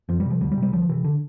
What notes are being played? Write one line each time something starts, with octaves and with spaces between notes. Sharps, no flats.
F2 F3
G3
C3
F3
D2 G3
G3
C3
G3
D2 F3
C3 E3
D3